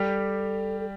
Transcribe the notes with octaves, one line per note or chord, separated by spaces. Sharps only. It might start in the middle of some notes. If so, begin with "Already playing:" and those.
Already playing: G3 G4 A4
A4